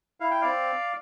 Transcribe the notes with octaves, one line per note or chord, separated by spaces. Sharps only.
E4 F5
G5
C4 D5 F5